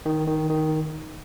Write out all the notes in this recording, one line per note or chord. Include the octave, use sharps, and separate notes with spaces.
D#3
D#3
D#3